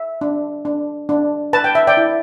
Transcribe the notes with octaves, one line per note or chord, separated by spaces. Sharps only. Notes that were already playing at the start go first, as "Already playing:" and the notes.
Already playing: E5
D4
D4
D4
B4 A5
G5
E5
D5 G5
E4